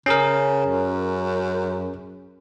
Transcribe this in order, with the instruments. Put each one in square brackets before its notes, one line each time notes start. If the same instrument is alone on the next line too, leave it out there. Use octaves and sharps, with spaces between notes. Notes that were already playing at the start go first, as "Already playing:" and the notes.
[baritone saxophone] C#3 [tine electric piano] C#4 G#4 A#4
[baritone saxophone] F#2